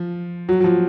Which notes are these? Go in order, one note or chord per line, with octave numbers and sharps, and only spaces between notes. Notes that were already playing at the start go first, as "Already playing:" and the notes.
Already playing: F3
F#3
F#3
F3